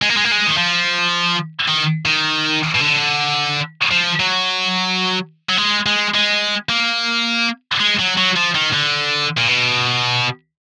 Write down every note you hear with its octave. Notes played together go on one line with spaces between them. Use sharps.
G#3
A#3
G#3
A#3
G#3
D#3
F3
D#3
D#3
B2
D3
F3
F#3
F#3
G#3
G#3
G#3
A#3
G#3
F#3
F#3
F3
D#3
D3
A#2
B2